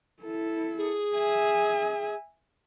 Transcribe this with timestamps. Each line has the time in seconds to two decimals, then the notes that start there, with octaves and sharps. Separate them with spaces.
0.23 E4 A4
0.78 G#4
1.17 E5 G#5